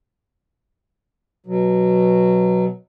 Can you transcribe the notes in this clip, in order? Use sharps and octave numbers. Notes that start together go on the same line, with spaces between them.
B2 F#3